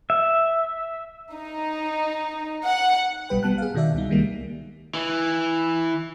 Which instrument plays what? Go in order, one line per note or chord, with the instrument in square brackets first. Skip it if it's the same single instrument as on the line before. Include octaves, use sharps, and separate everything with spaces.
[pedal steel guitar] E5
[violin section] D#4
F#5
[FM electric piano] A#1 B2 G3 B4 G5
G3 B3 A5 F#6
G#4 F5
B2 D#3 F#4 D5 E5
C#2 G3 D#4
C2 D#3 G3 G#3 A#3
[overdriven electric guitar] E3